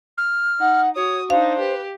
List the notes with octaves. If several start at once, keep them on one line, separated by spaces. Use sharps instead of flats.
F6
D#4 F#5
F#4 C#5 D#6
D4 D#4 C5 F5
G4 B4